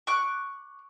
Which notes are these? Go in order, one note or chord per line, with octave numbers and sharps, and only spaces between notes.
C#6 D6 F#6